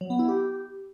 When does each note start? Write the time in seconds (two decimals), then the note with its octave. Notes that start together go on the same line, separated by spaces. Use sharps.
0.01 F#3
0.10 B3
0.19 E4
0.28 G4